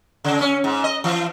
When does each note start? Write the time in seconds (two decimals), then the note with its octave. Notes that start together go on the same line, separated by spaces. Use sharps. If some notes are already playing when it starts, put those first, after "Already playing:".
0.24 C#3
0.41 C#4
0.64 G#2
0.84 D#5
1.04 E3